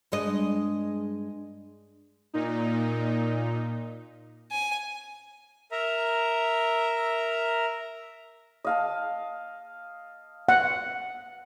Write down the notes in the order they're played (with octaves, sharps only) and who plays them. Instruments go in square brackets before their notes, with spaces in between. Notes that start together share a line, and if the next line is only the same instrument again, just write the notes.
[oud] G2 G#3 D#5
[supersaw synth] A#2 D#4
[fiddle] G#5
[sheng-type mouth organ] A#4 E5 A#5
[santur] D#5 F5 A5
[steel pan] F#5